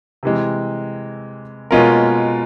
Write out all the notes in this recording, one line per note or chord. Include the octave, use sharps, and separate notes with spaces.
C3 E3 G#3
B2 G#3 C#4 F4 A#4